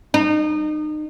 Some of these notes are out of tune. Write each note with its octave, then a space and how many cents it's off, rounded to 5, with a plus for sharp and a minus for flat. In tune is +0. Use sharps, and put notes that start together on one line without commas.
D#4 -30